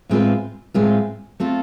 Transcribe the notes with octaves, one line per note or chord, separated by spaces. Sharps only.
A2 G#3 C4 F4 B4
A2 G#3 C4 F4 B4
A3 C4 F4 A4